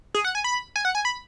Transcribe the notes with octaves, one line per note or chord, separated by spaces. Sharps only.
G#4
F#5
G#5
B5
G#5
F#5
G#5
B5